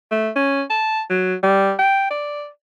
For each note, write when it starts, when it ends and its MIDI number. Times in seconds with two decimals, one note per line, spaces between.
0.11 0.29 57
0.36 0.62 61
0.70 1.02 81
1.10 1.35 54
1.43 1.73 55
1.79 2.07 79
2.10 2.48 74